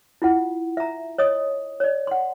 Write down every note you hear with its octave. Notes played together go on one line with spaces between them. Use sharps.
E4 F4 F#5
E5 A#5
C#5 D#5 D#6
C#5 D5
F#5 C6